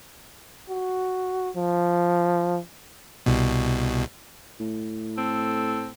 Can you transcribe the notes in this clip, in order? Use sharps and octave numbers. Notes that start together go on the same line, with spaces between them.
F#4
F3
C2 B2
A2
C4 A4